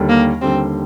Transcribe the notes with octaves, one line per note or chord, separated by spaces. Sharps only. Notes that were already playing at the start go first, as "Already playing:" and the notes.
Already playing: D#2 D3 G3
A#3
D#2 D3 G3 C4